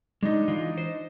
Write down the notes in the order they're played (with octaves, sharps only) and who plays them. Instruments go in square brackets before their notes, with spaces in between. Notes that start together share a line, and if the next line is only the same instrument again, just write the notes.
[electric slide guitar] G#3 [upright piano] D4 D#4
[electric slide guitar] E3 F4
C5